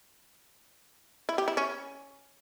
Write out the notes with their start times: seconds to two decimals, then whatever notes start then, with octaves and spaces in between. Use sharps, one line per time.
1.29 E4
1.38 G4
1.48 E4
1.57 C#4